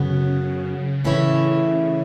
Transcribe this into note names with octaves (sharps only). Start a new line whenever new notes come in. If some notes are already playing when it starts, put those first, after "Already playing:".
Already playing: F#2 C#3 F#3 B3
A2 E3 C#4 E4 C#5